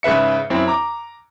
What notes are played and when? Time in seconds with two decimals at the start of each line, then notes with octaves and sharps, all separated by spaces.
0.03 G#2 C#3 B4 E5 C#7
0.50 F#2 C4 E4
0.68 A#5 D6